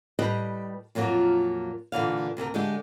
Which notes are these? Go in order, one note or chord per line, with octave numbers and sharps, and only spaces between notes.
A2 G3 G4 B4 D#5
F2 A#2 F#3 F4 A#4
A#2 D3 E3 F5
D2 C3 A4 A#4
D3 G#3 A3 G4